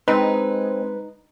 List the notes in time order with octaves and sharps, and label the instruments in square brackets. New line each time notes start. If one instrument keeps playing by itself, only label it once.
[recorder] G#3 [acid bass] C4 [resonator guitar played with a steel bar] D#4 [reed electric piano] B4